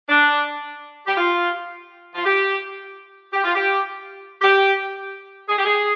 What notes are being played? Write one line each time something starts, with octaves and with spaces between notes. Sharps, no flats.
D4
G4
F4
F4
G4
G4
F4
G4
G4
G#4
G4
G#4